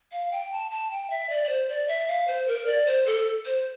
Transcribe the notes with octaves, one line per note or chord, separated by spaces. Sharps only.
F5
G5
A5
A5
G5
E5
D5
D5
C5
D5
E5
F5
C5
A#4
D5
C5
A4
C5